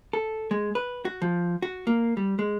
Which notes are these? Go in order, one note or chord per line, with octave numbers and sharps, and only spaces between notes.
A4
G#3
B4
F#4
F3
F#4
A#3
G3
G#3